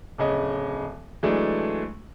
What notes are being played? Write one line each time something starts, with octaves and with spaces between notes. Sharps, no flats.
D1 C#3 D#5
E3 F#3 G#3 A3 D4